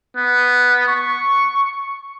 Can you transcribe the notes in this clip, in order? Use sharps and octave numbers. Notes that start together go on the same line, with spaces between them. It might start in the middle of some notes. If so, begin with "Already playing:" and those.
B3
C#6